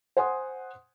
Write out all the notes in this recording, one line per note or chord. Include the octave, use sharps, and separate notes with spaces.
C5 F#5 G#5 C6 D#6